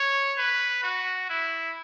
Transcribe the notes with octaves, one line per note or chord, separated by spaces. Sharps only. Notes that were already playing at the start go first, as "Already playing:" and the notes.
Already playing: C#5
B4
F#4
E4